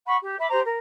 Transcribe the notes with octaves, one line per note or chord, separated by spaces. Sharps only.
F#5 B5 C#6
G4
E5 B5 D6
G4 C5 A#5
A#4